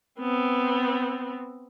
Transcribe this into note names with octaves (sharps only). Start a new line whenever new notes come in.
B3 C4